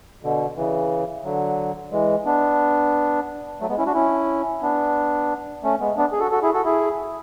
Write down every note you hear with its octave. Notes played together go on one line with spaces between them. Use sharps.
B2 D3
C#3 E3
D3 F#3
E3 G#3
B3 D4
F#3 A3
G#3 B3
C#4 E4
D4 F#4
C#4 E4
B3 D4
A3 C#4
G#3 B3
B3 D4
G#4
F#4 A4
F#4 A4
E4 G#4
F#4 A4
E4 G#4